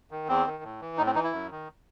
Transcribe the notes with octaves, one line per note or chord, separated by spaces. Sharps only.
D#3
E2 C4
D#3
A2
E3
A2 D#4
C4
E3 D#4
E4
F#2
D#3